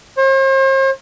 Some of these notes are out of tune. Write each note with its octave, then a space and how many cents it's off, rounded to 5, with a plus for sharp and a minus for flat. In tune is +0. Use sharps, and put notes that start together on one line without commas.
C5 +45